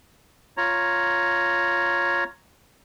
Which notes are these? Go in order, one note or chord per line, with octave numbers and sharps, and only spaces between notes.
F4 C#5 A#5